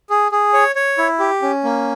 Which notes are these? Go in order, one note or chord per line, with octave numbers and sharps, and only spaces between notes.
G#4
G#4
C#5
C#5
E4
G4
C#4
A#3